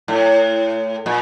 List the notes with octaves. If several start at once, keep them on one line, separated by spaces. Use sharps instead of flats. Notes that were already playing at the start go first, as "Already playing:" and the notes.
A2
A#2